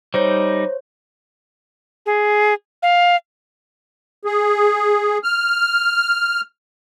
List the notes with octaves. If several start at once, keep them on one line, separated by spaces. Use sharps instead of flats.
G3 D#4 C5 C#5 G6
G#4
F5
G#4
F6